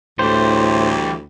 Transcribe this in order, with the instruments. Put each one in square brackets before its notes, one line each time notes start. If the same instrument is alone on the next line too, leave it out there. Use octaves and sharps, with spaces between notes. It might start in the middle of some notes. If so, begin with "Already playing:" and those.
[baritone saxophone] D2 [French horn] A2 [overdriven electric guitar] E3 G3 [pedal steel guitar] C5